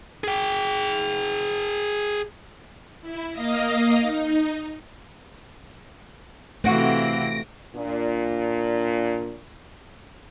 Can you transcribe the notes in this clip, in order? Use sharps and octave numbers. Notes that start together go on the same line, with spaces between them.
G#4 G5
E4
A#3 D#5 F5 D#6 A#6
D#4
C3 E3 A3 C4 F#4 F5 A#6 D7
A#2 D4